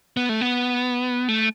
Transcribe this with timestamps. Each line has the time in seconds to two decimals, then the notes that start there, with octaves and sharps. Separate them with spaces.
0.17 B3
0.29 A3
0.41 B3
1.28 A3